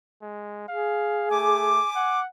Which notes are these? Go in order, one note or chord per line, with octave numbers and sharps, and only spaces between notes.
G#3
G#4 F5
A3 G#5 D6
F#5